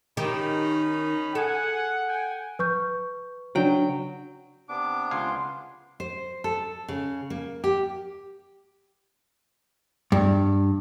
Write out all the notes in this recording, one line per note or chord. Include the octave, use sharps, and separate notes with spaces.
D#3 C#4 D#4 G4 B5
G#4 A4 F#5 G#5
G5 G#5
B4 C#6 G6
C#3 F#3 D4 G5
C3 B3 D4 D6
C#2 F5 G#5 C6
C5
A4
C#3
A#3
G4
G2